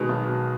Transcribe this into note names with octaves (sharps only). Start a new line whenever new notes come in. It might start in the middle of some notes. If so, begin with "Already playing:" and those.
Already playing: B2 D#3 G#3
B1
B2